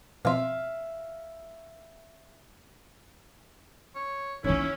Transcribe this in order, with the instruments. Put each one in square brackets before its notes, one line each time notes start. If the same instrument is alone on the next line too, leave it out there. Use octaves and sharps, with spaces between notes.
[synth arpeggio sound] B2 F3 C4 [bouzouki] E5 F5
[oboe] C#5
[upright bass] E3 D#4 [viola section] C#4 [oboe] E4